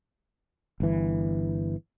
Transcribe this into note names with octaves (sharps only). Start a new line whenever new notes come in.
G1 E3